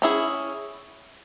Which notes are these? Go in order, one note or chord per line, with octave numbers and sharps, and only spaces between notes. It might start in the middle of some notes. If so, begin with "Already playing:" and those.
C#4 E4 G#4